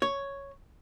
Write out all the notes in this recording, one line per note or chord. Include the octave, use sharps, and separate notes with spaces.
C#5